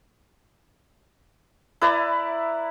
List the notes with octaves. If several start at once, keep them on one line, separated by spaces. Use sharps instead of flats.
E4 B4 D5 A#5